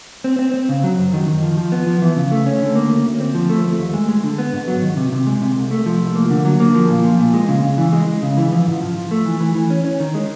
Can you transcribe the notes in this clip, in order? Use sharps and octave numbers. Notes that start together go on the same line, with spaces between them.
C4
C4
C4
C#3
F#3
F#2
D#3
D#3
F3
F3
B3
F3
E3
C#3
A3
C#4
D3
A#3
D2
D2
C4
F3
A3
A3
D#2
G#3
G#3
D3
B3
G#2
F#3
D#3
C3
C3
G#3
C3
C2
A3
F3
C2
A#3
D3
F#3
A#3
F3
A#2
F3
A#2
G#3
C#3
C#3
E3
G#3
G#3
C#3
E3
F3
G#2
F3
F3
A3
E3
E3
E3
C#4
C#4
D#3
G#3